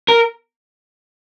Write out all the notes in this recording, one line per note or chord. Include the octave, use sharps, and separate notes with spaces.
A#4